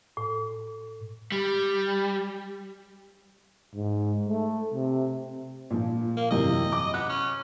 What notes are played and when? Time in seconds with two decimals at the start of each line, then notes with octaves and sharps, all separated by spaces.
0.17 A2
1.32 G3
3.75 G#2
4.28 A3
4.74 C3
5.71 A#2 F3
6.17 A#3
6.31 F#2 C3 E3 D#5
6.72 D6
6.94 B3 F#6
7.09 C#4